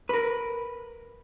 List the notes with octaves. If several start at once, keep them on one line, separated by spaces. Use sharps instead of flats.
A#4 B4